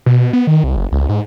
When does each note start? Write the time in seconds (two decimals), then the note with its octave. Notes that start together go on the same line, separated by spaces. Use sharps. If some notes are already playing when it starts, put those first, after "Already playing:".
0.06 B2
0.21 B2
0.33 B3
0.47 D#3
0.64 C2
0.76 F#1
0.92 C#2
1.09 G#2